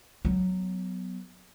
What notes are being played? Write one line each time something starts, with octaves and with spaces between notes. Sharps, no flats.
F#3 B3